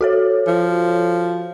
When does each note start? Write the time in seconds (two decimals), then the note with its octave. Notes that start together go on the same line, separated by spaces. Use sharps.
0.01 F#4 A4 C#5
0.47 F3